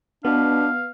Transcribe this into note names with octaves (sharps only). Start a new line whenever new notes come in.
B2 B3 D4 F5